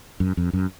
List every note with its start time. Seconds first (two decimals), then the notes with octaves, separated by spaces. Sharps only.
0.20 F#2
0.37 F2
0.53 F#2